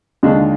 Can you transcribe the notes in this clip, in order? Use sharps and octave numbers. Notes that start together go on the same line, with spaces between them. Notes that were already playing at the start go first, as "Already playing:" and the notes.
D#2 D3 G#3 D4 F4